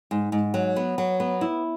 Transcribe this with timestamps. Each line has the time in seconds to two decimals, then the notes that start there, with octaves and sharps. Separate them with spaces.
0.11 G#2
0.32 G#2
0.54 F#3
0.76 B3
0.98 F#3
1.20 B3
1.41 E4